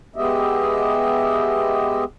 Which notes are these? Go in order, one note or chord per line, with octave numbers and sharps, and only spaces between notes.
G#3 B3 G4 D#5 E5